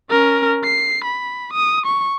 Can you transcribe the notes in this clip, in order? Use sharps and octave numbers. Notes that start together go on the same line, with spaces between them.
C#4 A#4
C7
B5
D#6
C#6